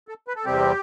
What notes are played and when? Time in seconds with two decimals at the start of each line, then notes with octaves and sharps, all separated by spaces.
0.08 A4
0.28 B4
0.36 A4
0.45 E2 C3 G3 C4 G4